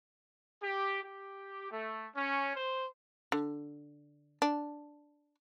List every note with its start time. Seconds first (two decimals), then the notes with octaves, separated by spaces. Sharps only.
0.62 G4
1.03 G4
1.70 A3
2.15 C#4
2.56 C5
3.32 D3
4.42 D4